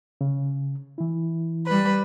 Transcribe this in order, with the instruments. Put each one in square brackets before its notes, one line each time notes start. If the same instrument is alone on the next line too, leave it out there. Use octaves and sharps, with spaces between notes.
[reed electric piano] C#3
E3 E4
[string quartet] G3 B4